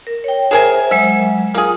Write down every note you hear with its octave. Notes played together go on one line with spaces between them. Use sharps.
A#4
C#5 G5
G#4 A#4 C5 E5 G#5
F#3 G#3 E5
A#3 F4 G#4